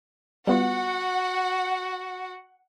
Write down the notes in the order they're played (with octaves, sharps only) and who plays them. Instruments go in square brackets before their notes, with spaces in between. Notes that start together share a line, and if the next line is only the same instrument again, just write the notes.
[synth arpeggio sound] G3 B3 F4 [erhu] F#4 [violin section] F#5